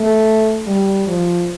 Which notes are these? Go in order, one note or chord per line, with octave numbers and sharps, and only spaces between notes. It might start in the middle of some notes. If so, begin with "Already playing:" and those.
Already playing: A3
G3
F3